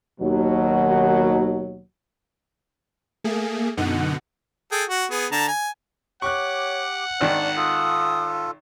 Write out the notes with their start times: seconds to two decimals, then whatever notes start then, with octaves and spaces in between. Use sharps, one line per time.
0.21 D#2 B2 F#3
3.24 A3 A#3 G#4
3.77 F#2 B2 D3 D#4 F#5
4.72 G#4 A4 G5
4.89 F#4 F#5
5.11 B3 G#4
5.32 D3 A5 A#5
5.48 G#5
6.22 G4 C#5 F#5 C#6 D6 F#6
7.21 G#1 D#3 D4 D5
7.56 F4 A4 D#6